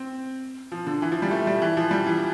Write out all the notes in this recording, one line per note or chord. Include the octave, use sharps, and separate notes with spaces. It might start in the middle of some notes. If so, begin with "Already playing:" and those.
Already playing: C4
F3
D3
E3
F3
G3
A3
G3
E3
F3
G3
E3